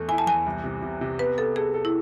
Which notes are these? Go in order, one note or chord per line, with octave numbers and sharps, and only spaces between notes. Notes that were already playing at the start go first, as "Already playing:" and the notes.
Already playing: E2 A3
E4 G#5
A5
E2 G#5
C2
C3
C3
C3
B3 B4
B3 A4
G#4 A4
A4
E4